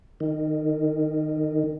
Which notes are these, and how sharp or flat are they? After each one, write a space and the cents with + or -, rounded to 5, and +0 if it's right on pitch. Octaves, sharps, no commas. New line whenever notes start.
D#3 -15